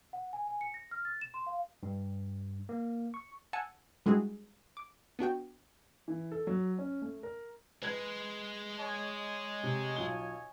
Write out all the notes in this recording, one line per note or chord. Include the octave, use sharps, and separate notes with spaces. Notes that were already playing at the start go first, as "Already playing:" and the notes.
F#5
G#5
G#5
C#7
A#6
F6
A6
E7
C6
F5
G2
A#3
C#6
F#5 G#5 A5 E6 C#7
G3 G#3 D4 E4 F#4 G#4
D6
B3 D4 F#4 G5
E3
A4
F#3
C#4
A3
A#4
G#3 B4 G#6
C#5 D#5 G#5
C3
B1 F4 G7